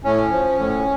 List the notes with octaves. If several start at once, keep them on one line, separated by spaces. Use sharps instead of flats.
A2 C#4
F3
A2